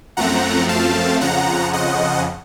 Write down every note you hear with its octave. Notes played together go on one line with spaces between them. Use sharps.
F#2 F3 A3 C4 F#5 A#5
F5 A5
F2 C#3 F3 F#5 A#5
D#5 F#5